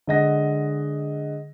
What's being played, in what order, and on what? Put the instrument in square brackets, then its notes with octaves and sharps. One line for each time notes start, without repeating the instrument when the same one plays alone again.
[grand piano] D3 G#3 D#5 F#5 A#6